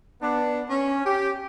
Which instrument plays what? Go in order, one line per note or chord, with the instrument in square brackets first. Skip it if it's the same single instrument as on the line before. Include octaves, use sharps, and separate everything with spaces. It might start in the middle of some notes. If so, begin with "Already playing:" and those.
[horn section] B3 D4
C#4
G4